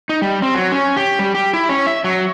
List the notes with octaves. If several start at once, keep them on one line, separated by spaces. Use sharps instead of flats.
D#4
G3
C4
F#3
C#4
G4
G3
G4
E4
C#4
E5
F#3